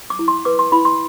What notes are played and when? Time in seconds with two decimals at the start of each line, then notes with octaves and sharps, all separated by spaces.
0.10 D6
0.19 E4
0.28 C6
0.45 B4 D6
0.59 C6
0.72 E4 B5
0.85 C6